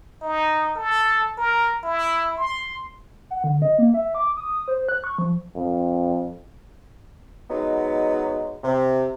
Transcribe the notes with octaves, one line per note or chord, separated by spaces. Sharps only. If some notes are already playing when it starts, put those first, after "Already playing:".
D#4
A4
A#4
E4
C6
F#5
D3
D#5
A#3
E5
D6
D#6
C5
F#6
C#6
F3
F2
F#3 G#3 B3 D#4
C3